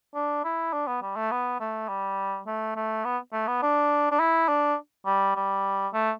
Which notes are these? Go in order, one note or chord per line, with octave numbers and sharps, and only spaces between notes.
D4
E4
D4
B3
G3
A3
B3
A3
G3
A3
A3
B3
A3
B3
D4
D4
E4
D4
G3
G3
A3